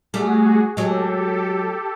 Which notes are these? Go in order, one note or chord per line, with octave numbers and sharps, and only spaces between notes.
G3 A3 F#4 G#4
F#3 G#3 G4 A4